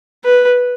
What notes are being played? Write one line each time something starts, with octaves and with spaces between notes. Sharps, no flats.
B4